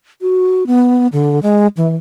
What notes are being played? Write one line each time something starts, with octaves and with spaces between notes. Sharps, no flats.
F#4
B3
D3
G#3
E3